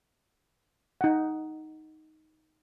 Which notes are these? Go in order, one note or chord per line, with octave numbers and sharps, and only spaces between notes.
D#4 F#5